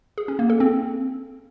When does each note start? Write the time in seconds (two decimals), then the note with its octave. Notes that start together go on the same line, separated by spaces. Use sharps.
0.18 G#4
0.28 C#4
0.39 A#3
0.50 A4
0.60 C4